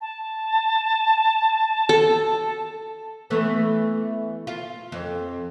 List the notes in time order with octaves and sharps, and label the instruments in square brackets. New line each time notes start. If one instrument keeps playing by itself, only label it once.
[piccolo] A5
[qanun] A4
[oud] E3 A3 B3
F4
F2